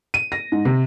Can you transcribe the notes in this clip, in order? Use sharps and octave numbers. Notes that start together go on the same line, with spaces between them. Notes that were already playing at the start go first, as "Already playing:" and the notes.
D#7
A#6
G#2
C3